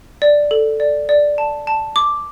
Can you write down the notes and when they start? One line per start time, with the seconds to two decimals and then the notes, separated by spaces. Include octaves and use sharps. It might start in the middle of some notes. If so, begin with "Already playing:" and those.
0.22 D5
0.51 A4
0.80 D5
1.09 D5
1.38 A5
1.67 A5
1.96 D6